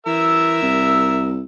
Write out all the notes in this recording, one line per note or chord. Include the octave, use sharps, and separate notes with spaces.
E3 A#4 E5 E6
C2